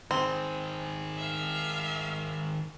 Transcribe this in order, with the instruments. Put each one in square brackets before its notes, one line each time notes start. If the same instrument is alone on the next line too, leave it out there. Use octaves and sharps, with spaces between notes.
[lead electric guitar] D#3 G#4 [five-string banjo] C4
[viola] E5 F5